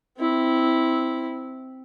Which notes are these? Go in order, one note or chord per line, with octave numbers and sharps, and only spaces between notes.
C4 E4